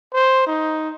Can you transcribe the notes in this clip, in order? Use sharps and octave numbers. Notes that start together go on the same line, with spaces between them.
C5
D#4